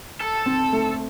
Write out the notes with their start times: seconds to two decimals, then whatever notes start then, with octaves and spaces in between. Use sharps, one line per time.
0.20 A4
0.46 C4
0.73 A3